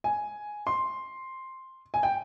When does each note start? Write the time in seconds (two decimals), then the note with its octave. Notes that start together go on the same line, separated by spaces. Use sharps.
0.04 G#5
0.67 C6
1.94 G#5
2.03 G5